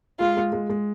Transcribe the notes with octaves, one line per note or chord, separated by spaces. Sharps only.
G#3 F4
G#3
G#3
G#3